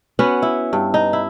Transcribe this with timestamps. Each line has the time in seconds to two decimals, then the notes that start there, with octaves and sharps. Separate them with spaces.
0.19 B3 C#4 F#4
0.42 E4
0.73 G2
0.94 D#4
1.13 E4